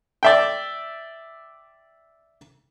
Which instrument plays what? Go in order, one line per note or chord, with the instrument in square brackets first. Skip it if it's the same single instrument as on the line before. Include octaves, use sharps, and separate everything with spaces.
[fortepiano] D5 E5 G5